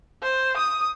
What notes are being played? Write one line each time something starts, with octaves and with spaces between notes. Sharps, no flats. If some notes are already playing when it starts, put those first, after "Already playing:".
C5
D#6